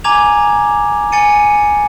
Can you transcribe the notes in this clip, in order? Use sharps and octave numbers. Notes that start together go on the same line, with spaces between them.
G#5 A#5 D6 G#6 F7
G#5 A6 C#7 D#7